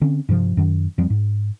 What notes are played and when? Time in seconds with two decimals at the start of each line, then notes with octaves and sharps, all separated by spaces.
0.01 D3 C4 C#4
0.29 G2 C3 F3
0.57 F#2 D#3
0.98 F2 F3 G3 C4
1.10 G#2